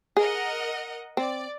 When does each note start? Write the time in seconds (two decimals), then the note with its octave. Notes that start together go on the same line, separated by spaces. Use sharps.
0.17 G#4 A#4 D#5 F#5
1.17 C4 D5